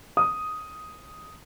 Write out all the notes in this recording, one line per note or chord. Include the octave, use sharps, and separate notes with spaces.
D#6